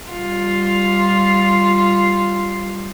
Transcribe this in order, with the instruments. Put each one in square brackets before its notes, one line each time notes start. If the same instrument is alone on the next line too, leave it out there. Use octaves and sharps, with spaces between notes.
[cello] G3 F4